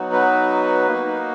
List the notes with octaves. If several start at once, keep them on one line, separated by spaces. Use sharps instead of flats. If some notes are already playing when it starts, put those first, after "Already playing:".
Already playing: F#3 B3 D#4 F#4
B4
A#3 D#4 F#4